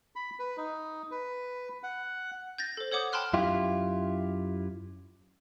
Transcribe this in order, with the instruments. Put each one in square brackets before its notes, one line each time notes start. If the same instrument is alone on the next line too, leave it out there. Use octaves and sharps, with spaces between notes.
[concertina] B5
B4
D#4
B4
F#5
[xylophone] G6 A6 A#6
A4 C5
A4 C#5 F#5 D6 D#6 G6
G5 A5 B5 C6 F6 F#6
[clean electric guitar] F#2 E4 F4 G4